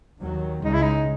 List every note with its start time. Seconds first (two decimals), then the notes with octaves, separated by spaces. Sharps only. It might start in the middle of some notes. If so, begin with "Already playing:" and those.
0.20 D#2 D#3 F#3
0.64 C#2 C#3 G#3 D#4
0.73 E4
0.82 D#4